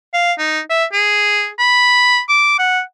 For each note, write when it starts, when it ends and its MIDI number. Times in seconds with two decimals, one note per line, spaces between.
0.14 0.33 77
0.38 0.60 63
0.70 0.85 76
0.93 1.49 68
1.59 2.19 83
2.29 2.54 86
2.59 2.81 78